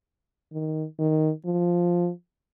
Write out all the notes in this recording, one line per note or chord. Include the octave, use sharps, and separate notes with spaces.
D#3
D#3
F3